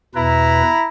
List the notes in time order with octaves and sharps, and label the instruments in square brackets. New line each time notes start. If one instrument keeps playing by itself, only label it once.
[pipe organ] E2 B2 B4 [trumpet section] E4 A#5 B5